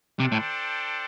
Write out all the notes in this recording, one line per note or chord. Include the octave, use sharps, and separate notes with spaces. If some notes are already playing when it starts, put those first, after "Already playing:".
C3 D4 A4 C5 G5
A2